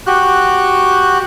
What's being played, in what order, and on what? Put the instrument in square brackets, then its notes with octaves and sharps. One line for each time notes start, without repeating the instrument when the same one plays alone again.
[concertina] F#4 G4 F#6